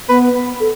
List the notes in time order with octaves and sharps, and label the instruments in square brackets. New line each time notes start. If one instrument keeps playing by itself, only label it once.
[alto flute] B3 [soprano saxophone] B4
[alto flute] A4